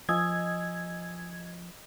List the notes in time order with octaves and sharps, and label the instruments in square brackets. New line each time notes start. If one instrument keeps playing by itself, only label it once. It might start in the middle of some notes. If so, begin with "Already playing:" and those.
[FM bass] F3 [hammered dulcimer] D#5 [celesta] G#5 D#6 E6 [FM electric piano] G#6